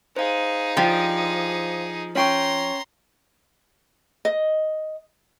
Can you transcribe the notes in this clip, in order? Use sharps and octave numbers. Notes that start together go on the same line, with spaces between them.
D#4 G#4 C5 F5
F3 D4 G4 G5
C#4 C#5 G5 A#5 C6 C#6
D#5